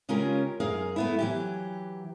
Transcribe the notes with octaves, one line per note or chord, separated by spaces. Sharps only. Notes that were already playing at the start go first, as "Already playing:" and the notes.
C#3 G#3 C#4 F4 G4 A#4
F#2 G#4 A#4 F5
A3 B3 E4
E3 F#3 G4